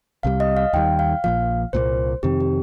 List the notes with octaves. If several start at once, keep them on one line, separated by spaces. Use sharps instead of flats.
C2 C3 G3 F5
D#5
F5
D#2 D#3 G3 G5
F5
A#1 A#2 F3 F5
C2 A#2 F3 A#3 C5
F2 C3 D#3 C4 G4
G4